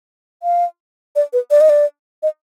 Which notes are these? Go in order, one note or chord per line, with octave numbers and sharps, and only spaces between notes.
F5
D5
B4
D5
D#5
D5
D#5